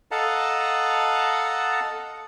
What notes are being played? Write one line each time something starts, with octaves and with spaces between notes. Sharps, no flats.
A4 D#5 F5 F#5 A5 A#5